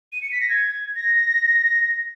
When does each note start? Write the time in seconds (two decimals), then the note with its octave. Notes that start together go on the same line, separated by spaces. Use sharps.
0.12 D#7
0.22 C#7
0.32 B6
0.41 A#6
0.49 G#6
0.96 A#6